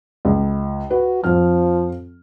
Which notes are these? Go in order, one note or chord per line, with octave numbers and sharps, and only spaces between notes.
C#2
F#4 B4
F2 F3 C4 F6